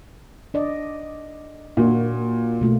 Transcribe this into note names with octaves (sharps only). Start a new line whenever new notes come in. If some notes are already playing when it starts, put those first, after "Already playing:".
D4 D5 D#5
A#2 A#3 D4 F#4
B2 A3 F4